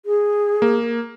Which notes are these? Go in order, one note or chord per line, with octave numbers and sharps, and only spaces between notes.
G#4
A#3